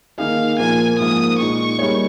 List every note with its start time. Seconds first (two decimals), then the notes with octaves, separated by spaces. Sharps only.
0.18 D#3 A#3 D#4 G#4 F5
0.58 A#2 F3 A#3 G#5
0.99 G#2 F3 A#3 F4 D#6
1.39 A#2 G#3 D#4 C#6
1.79 G3 A#3 D#4 G#4 C#5